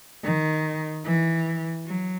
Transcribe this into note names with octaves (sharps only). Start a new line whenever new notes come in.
D#3
E3
F#3